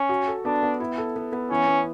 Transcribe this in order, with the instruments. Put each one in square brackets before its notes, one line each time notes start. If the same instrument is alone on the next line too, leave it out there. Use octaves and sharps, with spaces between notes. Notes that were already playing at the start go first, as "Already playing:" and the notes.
Already playing: [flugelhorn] C#4
[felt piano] F#4
A4
[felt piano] B3 [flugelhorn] D4
[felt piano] B3
E4
A4
B3
B3
[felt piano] E3 [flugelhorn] C#4
[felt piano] B3